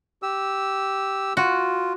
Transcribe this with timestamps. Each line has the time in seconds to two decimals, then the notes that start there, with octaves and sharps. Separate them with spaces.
0.23 G4 E6
1.37 F4 F#4